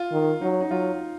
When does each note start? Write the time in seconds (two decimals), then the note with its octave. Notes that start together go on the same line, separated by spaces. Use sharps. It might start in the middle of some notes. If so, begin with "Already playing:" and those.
Already playing: F4
0.12 D#3
0.41 F#3 D#4
0.61 D#4
0.71 F#3 F4